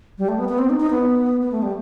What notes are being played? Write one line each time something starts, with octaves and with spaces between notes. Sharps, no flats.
G3
A3
B3
B3
C4
D#4
D#4
B3
B3
A3
G3